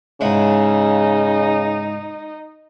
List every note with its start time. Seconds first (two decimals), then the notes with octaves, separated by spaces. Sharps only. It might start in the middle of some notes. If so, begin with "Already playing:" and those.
0.21 G#2 C#3 D#4 E4 F#5